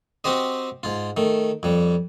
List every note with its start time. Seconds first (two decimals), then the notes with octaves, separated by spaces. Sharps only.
0.24 C4 F#4 G4 C5 D#5
0.83 G#2 F4
1.17 D#3 A3
1.63 F2 G3